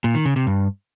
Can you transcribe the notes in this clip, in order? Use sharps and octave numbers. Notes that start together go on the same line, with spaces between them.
A#2
D#3
C#3
C3
G2